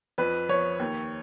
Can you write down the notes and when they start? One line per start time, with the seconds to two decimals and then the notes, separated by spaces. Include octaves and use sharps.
0.18 F2 B4
0.49 F3 C#5
0.80 D#2